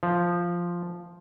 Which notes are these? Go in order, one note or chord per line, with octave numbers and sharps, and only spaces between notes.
F3